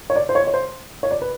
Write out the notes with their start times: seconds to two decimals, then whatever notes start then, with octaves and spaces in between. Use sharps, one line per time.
0.10 C#5
0.16 D5
0.29 C5
0.35 C#5
0.47 C#5
0.54 C5
1.03 C#5
1.11 D5
1.22 B4